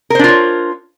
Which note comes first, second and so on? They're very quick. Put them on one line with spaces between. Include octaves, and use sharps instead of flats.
A#4 C5 D4 F4 C#5